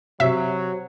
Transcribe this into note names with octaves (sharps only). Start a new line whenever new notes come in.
C3 F#3 F#4 C5 E5